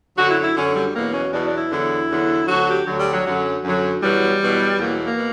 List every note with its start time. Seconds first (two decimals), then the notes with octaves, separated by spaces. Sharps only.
0.16 F#2 D3 F#3 F#4
0.29 E4
0.42 E4
0.55 F#2 D3 F#3 C#4
0.75 G3
0.94 E2 B2 F#3 A#3
1.13 C#4
1.32 E2 B2 F#3 D4
1.45 D4
1.58 E4
1.70 E2 D3 F#3 E4
2.09 E2 D3 F#3
2.47 D2 D3 F#3 F#4
2.68 G4
2.86 D2 D3 F#3
2.99 G3
3.13 F#3
3.25 F#2 D3 F#3
3.64 F#2 D3 F#3
4.01 E2 B2 F#3 G3
4.40 E2 B2 F#3
4.78 E2 B2 F#3 A#3
5.04 A#3
5.18 B2